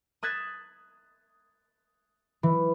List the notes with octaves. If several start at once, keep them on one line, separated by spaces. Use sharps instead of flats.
D#6 F#6 G#6 A6 B6 E7
E3